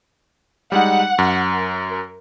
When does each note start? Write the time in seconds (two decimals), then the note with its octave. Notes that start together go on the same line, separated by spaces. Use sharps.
0.72 G3 G#3 D#4 F#5
1.18 F#2
1.49 A#4